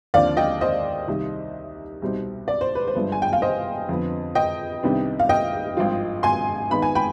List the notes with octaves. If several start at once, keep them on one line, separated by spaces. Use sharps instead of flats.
D#2 D3 F3 C4 D5 F5
D#5 G5
C5 D#5
C2 C3 D#3
C2 B2 G3 C4 D#4
D5
C5
B4
C5
G1 G2 F3 G#3 B3
G#5
G5
F5
C5 D#5
F2 D3 F3 B3
D#5 G5
C2 C3 D#3 B3 D4
F5
D#5 G5
G#1 G2 F3 C4 F4
G#5 C6
G#1 G#2 D#3 B3 D#4 B5
G#5
G5 B5